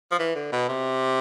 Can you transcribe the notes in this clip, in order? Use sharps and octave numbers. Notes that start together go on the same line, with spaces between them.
F3
E3
D3
B2
C3